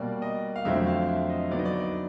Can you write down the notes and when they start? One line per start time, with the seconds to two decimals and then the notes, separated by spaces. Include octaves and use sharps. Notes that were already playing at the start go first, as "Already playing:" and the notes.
Already playing: B2 G3 A#3 D5
0.22 D#5
0.56 F5
0.65 F2 D3 F#3 A3 C4 E5
0.76 E5
0.87 F5
1.09 E5
1.30 D#5
1.50 D3 F#3 B3 D#4 D5
1.59 D#5
1.65 D5
1.73 D#5
1.80 D5